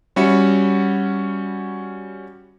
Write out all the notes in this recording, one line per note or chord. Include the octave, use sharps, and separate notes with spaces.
G3 C#4 F#4 E5 B5 C#7